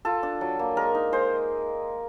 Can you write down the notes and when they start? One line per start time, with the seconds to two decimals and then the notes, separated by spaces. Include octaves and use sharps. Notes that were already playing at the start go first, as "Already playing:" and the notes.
0.05 F4 A4
0.23 D4
0.41 F#3
0.59 A#3
0.77 G#3 A#4
0.95 D#4
1.12 G#3 C5